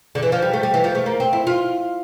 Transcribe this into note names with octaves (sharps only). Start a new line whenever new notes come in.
D3
E3
F3
G3
A3
G3
E3
F3
A3
A#3
C4
E4
F4